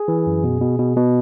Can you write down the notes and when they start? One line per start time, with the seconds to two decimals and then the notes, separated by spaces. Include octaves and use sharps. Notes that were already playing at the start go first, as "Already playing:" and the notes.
Already playing: G#4
0.08 E3
0.26 F#2
0.44 B2
0.61 B2
0.79 B2
0.97 B2